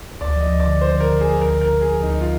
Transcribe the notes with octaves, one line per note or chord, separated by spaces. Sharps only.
D2 D5
F3 D#5
D2
D5
D3
F3 C5
D3
A#4
D3
F3 G#4
D2 A#4
D3
A#4
D3
G#4
F3
D2 D#4
F3 F4